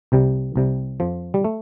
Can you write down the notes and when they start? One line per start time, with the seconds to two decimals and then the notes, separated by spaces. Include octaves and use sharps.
0.12 C2 C3 G3
0.56 C2 C3 G3
1.00 F2 F3
1.34 G3
1.44 A3